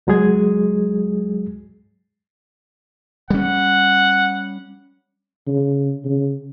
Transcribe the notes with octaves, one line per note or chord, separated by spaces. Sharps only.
C#2 F#3 G#3 G#4 G#6
G3 C#4 F#5
C#3
C#3